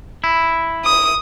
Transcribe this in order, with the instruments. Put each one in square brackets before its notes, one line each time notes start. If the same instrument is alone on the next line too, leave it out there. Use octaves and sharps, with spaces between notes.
[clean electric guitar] E4
[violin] D#6